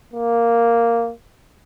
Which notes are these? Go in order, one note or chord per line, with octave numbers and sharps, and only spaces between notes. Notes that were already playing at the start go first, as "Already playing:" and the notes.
A#3